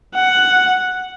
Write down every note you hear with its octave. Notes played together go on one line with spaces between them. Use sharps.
F#5